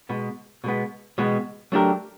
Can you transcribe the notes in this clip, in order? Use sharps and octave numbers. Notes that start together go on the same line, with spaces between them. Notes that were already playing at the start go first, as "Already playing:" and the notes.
B2 G#3 B3
B2 G#3 B3
B2 G#3 B3
F#3 A3 D4 G4 A#4